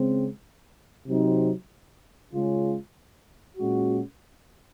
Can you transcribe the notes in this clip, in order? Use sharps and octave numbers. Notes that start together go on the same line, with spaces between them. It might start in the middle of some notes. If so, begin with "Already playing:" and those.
Already playing: C#3 G#3 C4
C3 F#3 C4 D#4
C#3 G#3 C#4 F4
A#2 G#3 C#4 F#4